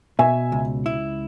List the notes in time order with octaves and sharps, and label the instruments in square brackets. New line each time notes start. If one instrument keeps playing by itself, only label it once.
[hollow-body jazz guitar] B2 [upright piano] E5 G#5
[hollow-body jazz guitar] C#2
E4